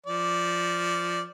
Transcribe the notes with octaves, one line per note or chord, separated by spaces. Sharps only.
F3 D5